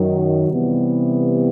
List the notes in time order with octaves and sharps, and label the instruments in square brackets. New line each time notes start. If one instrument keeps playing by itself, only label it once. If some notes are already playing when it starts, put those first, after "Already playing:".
Already playing: [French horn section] F#2 D#3 F#3
C3 E3 G3 B3